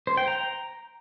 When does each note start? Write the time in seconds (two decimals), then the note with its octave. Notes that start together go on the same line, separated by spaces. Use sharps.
0.07 C5
0.17 G5
0.28 A#5